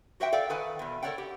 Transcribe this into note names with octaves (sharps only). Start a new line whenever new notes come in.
F#4 G4 C5 E5 F#5 G5
A4 D5 F5 G5
D#3 A4 B4 F#5 G#5
E2 B2
A4 A#4 C#5 D5 F#5 G5
G4